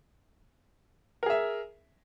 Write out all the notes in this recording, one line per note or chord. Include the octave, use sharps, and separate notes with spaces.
G#4 A#4 E5